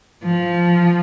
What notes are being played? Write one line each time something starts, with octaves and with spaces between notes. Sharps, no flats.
F3